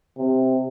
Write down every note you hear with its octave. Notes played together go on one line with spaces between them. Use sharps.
C3